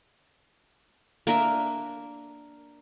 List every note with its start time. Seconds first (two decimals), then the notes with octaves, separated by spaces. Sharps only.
1.27 A#3 D4 A#4 E5